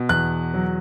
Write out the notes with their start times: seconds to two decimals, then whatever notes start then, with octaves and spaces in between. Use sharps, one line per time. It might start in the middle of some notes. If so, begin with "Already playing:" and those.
Already playing: B2
0.09 E2 F#6
0.54 F#3